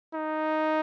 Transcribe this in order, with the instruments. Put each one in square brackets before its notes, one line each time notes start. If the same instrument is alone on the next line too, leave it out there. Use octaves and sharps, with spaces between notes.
[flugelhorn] D#4